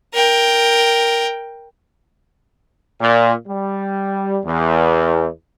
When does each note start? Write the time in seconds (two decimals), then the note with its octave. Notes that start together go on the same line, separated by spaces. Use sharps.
0.14 A#4 G5
3.01 A#2
3.47 G3
4.45 E2